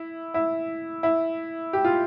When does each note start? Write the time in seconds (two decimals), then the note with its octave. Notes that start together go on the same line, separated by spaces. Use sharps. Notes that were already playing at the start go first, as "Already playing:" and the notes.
Already playing: E4
0.34 E4
1.03 E4
1.73 G4
1.85 F4